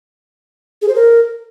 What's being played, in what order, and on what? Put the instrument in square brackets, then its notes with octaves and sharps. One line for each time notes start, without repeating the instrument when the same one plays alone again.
[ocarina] G#4
C5
A#4